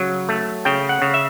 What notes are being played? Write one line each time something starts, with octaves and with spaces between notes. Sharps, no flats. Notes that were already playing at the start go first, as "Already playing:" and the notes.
Already playing: C#3 F#3
A3
C#3 G5
F#5
C#3
E5